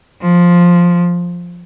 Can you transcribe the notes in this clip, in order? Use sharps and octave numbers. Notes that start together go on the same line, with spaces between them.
F3